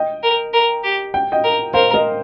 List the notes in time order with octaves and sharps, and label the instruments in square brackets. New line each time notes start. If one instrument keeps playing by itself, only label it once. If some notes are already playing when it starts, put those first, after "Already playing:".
Already playing: [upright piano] D#5 G5
[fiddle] A#4
A#4
G4
[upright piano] G5
D#5 G5
[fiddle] A#4
[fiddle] A#4 [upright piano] C5 F5
[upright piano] A#4 D#5